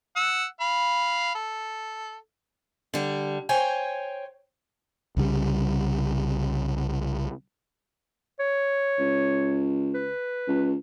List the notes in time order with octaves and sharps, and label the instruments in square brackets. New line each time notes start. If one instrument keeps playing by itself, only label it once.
[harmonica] F#5 E6
F5 B5
A4
[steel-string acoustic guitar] D3 G3
C5 C#5 G5 G#5
[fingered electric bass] C2 C#3 G3
[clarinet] C#5
[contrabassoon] C#2
[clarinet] B4
[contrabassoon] C#2